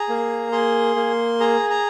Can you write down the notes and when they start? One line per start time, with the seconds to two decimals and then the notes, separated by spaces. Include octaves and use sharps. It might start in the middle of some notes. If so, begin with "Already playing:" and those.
Already playing: G#4 A#5
0.09 A#3
0.52 G#4 C6
0.96 A#3
1.40 G#4 A#5
1.70 A#5